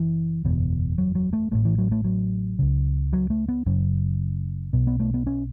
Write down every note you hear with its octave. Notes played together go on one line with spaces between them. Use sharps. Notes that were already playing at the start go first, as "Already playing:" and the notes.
Already playing: F#1 E3
F#1 E2 B2
F#3
F#3
A3
A1 A2 A3
E3
F#3
A3
F#3
C#2 C#3
F#3
A3
B3
F#1 F#2 C#3
B1 B2
B3
A3
B3
C#4